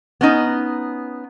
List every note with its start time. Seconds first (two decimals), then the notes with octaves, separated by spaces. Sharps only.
0.21 B3 C#4 D#4